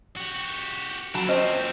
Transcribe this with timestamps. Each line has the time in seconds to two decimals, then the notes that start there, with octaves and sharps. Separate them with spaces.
0.17 F#4 G4
1.14 A#2 F#3 C4 A5
1.28 C#4 C5 D#5